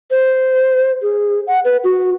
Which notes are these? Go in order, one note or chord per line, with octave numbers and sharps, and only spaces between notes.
C5
G#4
F#5
B4
F#4